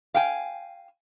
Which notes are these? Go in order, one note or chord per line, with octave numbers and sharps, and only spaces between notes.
F5 G5 G#5